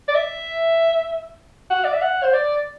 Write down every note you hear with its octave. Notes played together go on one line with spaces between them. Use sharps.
D5
E5
F#5
D5
E5
F#5
C5
D5